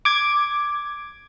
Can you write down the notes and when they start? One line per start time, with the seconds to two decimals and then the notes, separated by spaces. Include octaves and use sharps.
0.05 D6 G#6